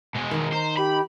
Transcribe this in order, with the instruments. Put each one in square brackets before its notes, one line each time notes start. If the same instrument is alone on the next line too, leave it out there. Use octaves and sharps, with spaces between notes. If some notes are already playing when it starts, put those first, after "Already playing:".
[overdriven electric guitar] B2 G#3
[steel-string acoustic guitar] D#3 D#4
[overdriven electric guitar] C5 [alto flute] A#5
[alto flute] G4 [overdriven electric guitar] B5